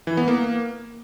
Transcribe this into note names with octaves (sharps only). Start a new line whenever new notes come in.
E3
B3
A#3